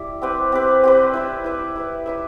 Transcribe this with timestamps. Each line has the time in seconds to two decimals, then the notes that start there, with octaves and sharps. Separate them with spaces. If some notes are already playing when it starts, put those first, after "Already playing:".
Already playing: G3 E4
0.22 C4 G4 B4
0.52 C4 G4 B4
0.83 C4 G4 B4
1.13 E4 B4 E5
1.44 E4 B4 E5
1.75 E4 B4 E5
2.06 E4 B4 E5